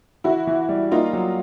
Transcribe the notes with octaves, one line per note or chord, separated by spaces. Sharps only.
E3 E4 F#4
E3
G3
A#3 D#4 F4
F#3